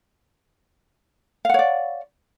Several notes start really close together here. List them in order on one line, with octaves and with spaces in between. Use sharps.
F5 F#5 C#5 D5